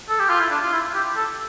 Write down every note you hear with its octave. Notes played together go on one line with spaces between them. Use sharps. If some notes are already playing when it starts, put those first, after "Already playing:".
A4
G4
F4
E4
D4
F4
E4
G4
A4